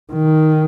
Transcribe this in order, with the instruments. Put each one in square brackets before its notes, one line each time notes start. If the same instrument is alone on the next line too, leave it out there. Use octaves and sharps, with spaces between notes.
[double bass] D#3